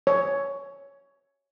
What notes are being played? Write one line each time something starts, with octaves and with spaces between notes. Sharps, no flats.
C#5